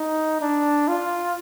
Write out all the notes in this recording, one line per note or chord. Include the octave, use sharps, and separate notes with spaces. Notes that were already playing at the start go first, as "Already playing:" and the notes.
Already playing: D#4
D4
F4